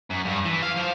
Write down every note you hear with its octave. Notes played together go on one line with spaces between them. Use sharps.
F#2
G2
E3
F5
F3